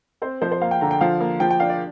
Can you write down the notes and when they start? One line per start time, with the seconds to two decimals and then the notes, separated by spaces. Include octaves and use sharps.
0.22 C4 C5
0.42 F3 C5
0.52 C5
0.61 A#3 F5
0.71 G5
0.81 D3 A#5
0.91 G5
1.01 F3 F5
1.20 A#3
1.40 F3 G5
1.51 G5
1.60 D4 F5
1.70 D5